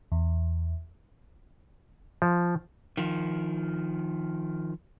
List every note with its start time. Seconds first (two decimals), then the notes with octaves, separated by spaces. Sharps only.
0.12 E2
2.22 F3
2.97 D#3 F3